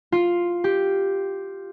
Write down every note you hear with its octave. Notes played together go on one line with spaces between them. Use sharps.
F4
G4